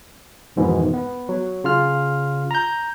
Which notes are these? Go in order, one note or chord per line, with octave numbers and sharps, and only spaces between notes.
F2 G#2 B2 D#3 E3
B3
F#3
C#3 F4 F6
A#5 G6